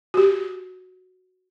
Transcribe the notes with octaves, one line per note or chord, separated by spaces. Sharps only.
F#4 G4